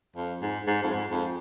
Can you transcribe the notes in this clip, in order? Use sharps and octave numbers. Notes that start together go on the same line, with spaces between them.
F2
G#2
G#2
F2
G#2
F2